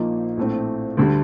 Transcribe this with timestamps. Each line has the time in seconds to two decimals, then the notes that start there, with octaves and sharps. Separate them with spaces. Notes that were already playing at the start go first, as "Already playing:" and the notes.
Already playing: A#1 A#2 F3 A#3 D#4
0.37 A#1 A2 A3 C4
0.97 D2 D3 G3